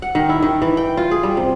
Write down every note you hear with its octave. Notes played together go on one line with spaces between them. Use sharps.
F#5
D#3
E4
D#3
E3
G5
F4
G#4
G3
C3